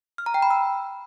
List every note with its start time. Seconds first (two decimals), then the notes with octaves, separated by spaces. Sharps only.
0.18 F6
0.26 A#5
0.34 G5
0.42 B5
0.50 E6